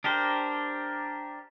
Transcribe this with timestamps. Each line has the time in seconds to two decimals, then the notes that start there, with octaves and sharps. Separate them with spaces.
0.04 D4 G4 A#4 C5